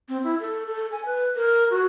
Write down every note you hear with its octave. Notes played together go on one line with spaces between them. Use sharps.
C4
E4
A4
A4
G#5
B4
A#4
F#4